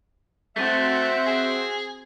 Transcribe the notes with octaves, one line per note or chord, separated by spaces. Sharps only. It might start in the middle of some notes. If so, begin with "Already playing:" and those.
A3 C4 F#4 E5 F#5
G#4